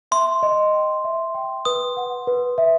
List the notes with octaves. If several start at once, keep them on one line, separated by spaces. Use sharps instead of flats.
E5 C6
D#5
G5
E5
G5
B4 D#6
F#5
B4
E5